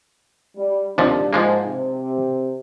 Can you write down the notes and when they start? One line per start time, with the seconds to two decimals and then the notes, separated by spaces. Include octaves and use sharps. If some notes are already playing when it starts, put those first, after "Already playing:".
0.57 G3
0.98 D#2 C3 F3 G3 D4
1.33 G#2 F3 G#3 A#3
1.66 C3